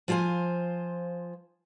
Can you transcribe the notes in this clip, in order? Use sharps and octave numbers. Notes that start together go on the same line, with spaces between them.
F3 F4 C5 G5 G#5